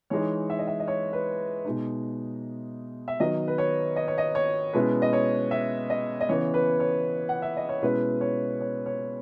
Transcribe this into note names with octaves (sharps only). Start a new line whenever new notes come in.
E3 G#3 D#4 C#5
E5
D#5
E5
D#5
C#5
B4
B2 G#3 D#4
E5
D#3 F#3 B3 D#5
B4
C#5
D#5
C#5
D#5
C#5
B2 G#3 C#4 E4 B4
D#5
C#5
E5
D#5
D#5
C#3 E3 B3 C#5
B4
C#5
F#5
E5
D#5
C#5
B2 G#3 C#4 E4 B4
C#5
C#5
C#5